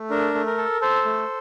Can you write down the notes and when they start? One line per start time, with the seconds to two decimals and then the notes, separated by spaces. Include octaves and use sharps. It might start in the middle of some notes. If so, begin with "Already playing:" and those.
Already playing: A3
0.10 D4 A#4
0.34 A3
0.46 A#4
0.57 A4
0.81 A4 C5
1.05 A3